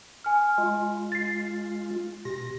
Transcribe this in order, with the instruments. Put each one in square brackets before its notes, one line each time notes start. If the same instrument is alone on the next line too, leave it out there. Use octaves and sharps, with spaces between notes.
[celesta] G#5 F6
[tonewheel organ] G#3 F4
[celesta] A6 C7
[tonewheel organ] B2 A#6 [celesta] G4